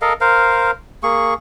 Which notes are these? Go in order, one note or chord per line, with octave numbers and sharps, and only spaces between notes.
A4 A#4 D#5 F5
A#4 C5 F5
A#3 G#4 C#6